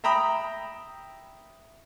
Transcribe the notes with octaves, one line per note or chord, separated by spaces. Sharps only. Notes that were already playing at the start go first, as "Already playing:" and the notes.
E5 G5 A#5 B5 D#6